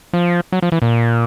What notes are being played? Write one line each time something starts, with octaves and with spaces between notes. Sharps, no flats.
F3
F#3
F3
E3
A#2